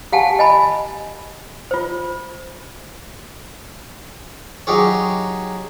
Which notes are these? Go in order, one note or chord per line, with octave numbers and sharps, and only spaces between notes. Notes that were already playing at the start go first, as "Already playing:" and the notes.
G4 F5 F#5 G#5 A5
D#5 G#5 B5
F4 C5
F#3 D#4 G4 G#4 C#5